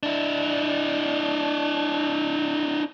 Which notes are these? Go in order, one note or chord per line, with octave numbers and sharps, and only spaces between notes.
D4 E4